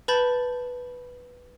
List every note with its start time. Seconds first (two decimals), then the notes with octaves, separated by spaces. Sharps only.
0.08 B4 A5 B5 G6 A6 F#7